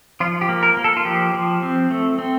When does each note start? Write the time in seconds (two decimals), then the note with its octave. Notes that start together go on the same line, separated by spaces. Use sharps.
0.20 F3 F4
0.41 G4
0.49 A#3
0.63 A#4
0.77 A#3
0.84 A4
0.97 F4
1.05 F3 G4
1.34 F3
1.63 C4
1.90 A3
2.19 C4